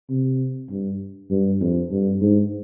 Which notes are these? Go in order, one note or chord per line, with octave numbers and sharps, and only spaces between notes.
C3
G2
G2
F2
G2
G#2